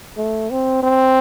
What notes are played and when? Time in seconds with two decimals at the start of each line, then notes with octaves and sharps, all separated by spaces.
0.17 A3
0.50 C4
0.83 C4